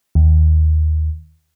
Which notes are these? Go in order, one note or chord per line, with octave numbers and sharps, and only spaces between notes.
D#2